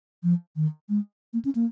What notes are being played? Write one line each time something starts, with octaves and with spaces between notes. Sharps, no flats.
F3
D#3
G#3
A#3
C#4
A#3